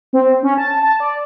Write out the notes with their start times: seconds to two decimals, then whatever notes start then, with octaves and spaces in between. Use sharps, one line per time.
0.13 C4
0.43 C#4
0.58 A5
0.83 A5
1.00 D5